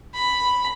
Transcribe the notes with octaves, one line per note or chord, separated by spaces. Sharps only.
B5